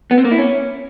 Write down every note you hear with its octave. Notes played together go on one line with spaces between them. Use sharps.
B3
C4
A#3
E4
C#4